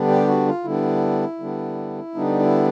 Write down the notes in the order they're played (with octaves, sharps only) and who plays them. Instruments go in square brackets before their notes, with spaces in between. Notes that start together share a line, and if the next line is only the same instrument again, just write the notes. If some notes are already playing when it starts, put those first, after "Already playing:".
Already playing: [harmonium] D3 G3 B3 D4
G4
F#4
F4
D3 G3 B3 D4 E4
D3 G3 B3 D4
D3 G3 B3 D4 D#4
E4